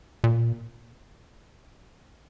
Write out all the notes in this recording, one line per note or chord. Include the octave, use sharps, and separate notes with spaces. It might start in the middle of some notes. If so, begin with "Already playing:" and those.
A#2